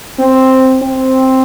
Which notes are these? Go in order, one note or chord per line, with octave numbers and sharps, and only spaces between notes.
C4
C4